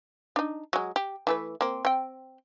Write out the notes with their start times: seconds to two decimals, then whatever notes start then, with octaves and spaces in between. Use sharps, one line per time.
0.36 D4 D#4
0.73 F#3 G#3
0.96 G4
1.27 E3 A3 B4
1.61 A#3 C4
1.85 C4 G5